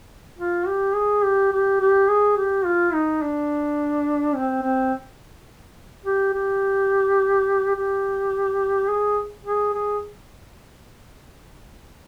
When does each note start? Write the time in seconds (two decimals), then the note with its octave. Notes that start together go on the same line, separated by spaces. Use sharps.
0.38 F4
0.67 G4
0.95 G#4
1.24 G4
1.52 G4
1.81 G4
2.09 G#4
2.37 G4
2.65 F4
2.93 D#4
3.22 D4
4.35 C4
4.63 C4
6.05 G4
6.33 G4
7.75 G4
8.88 G#4
9.45 G#4
9.74 G#4